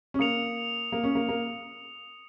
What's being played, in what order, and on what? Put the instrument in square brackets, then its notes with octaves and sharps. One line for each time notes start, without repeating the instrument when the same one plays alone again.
[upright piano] C#4
[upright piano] A#3 [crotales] D#6 C#7 F7
[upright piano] A#3
C#4
A#3
A#3